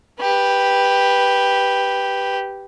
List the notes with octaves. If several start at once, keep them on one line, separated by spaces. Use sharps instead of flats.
G4 B4